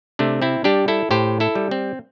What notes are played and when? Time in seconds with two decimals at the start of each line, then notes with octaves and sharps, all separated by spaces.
0.19 C3 A3 D4
0.42 C4 E4
0.64 G3 D4 G4
0.88 E4 A4
1.11 A2 G4 C5
1.40 E4 A4
1.55 G3
1.71 C4